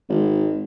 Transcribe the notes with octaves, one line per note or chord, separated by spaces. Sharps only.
G#1